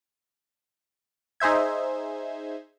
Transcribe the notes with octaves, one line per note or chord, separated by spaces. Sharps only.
D#4 G#4 C5 E5 G#6